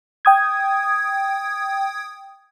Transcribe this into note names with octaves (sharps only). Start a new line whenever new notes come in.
G5 D#6 G#6